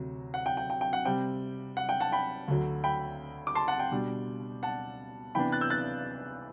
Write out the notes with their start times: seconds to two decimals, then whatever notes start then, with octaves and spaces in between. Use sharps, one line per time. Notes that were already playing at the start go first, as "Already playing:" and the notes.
Already playing: D2 C3 F#3
0.34 F#5
0.46 G5
0.57 G5
0.70 G5
0.81 G5
0.93 F#5
1.05 C3 G3 C4 G5
1.77 F#5
1.89 G5
2.00 F#5 A5
2.12 G5 B5
2.48 D2 D3 F#3
2.84 G5 B5
3.47 D6
3.55 A5 C6
3.68 F#5 A5
3.79 G5
3.92 B2 G3 D4
4.63 F#5 A5
5.35 C3 E3 B3 D4 G5 B5
5.52 F#6 A6
5.61 E6 G6
5.70 F#6 A6